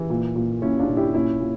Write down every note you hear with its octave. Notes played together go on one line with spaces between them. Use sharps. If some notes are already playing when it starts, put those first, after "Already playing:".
Already playing: E3
A#2
A#2
A#2 C#4 E4
D4 F4
A#2
E4 G4
A#2 C#4 E4
A#2